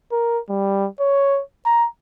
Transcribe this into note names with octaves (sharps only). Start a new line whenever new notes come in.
A#4
G3
C#5
A#5